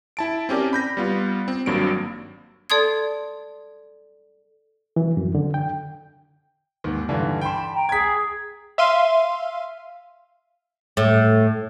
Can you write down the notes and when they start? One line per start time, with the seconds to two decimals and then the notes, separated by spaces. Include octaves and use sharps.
0.17 E4 A5 D7
0.49 C4 C#4 G4 A#4 D5
0.73 B5 G6 A#6
0.97 G3 B3 F4
1.48 C4
1.66 G#1 G2 F#3 A#3 D7
2.70 A4 D5 A5 C6 D#6 G#6
4.96 E3
5.17 F#2
5.35 D3
5.54 G5
6.84 D#2 G#2
7.09 G2 D3 E3
7.41 G5 A5 B5 C6
7.73 G5 A#5
7.89 G#4 G#6 B6
8.78 E5 F5 C6 D#7
10.97 A2